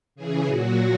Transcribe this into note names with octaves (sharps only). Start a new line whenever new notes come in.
C#3 E3 G#4
A#2 F#3 F#4